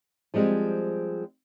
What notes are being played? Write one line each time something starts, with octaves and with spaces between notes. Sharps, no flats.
F3 G3 G#3 C4